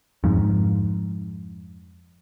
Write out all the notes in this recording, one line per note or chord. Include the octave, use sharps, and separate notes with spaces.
F2 G#2